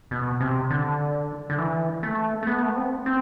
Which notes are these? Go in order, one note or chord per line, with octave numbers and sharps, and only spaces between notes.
B2
C3
D3
D3
E3
A3
A3
B3
A3
B3
C4
C4